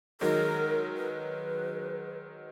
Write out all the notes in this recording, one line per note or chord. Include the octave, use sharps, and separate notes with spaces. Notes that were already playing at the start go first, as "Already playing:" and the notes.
D#3 F#3 G#3 A#4
B4